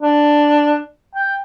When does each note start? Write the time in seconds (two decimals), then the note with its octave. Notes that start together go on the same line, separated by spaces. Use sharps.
0.02 D4
1.15 G5